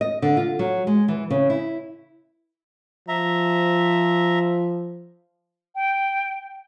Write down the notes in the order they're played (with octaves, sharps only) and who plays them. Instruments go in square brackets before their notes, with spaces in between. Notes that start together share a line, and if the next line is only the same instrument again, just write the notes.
[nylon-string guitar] D#5
D3
F4
F#3
G#3
E3
C#3
E4
[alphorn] F3 [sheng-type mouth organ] E5 A#5
[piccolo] G5